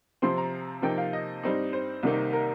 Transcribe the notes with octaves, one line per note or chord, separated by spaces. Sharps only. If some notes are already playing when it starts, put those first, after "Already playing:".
C3 F3 C4 C6
A#5
C3 F3 A#3 D#4 G5
F5
D#5
G2 G3 C4 D#4
C5
C2 C3 D#3 A#3 D#4
A#4